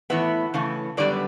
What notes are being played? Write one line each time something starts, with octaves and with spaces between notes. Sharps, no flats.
A2 E3 B3 E5
C#3 E3 A3
F#2 D3 G3 B3 D5